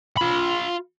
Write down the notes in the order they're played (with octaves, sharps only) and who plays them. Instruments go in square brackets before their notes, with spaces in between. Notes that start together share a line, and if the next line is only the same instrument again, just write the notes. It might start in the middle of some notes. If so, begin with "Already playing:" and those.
[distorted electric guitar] F4 B5